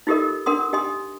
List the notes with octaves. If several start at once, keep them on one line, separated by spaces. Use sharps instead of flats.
D#4 F4 G4 A4 A#4 D#5
D4 A#4 F#5 C6 D#6
G4 D#5 G#5 C6 D#6